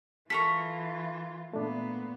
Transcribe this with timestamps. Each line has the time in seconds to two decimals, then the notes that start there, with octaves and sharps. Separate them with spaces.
0.30 E3 F4 A4 A#4 C#6 B6
1.53 A#2 A3 B3 D4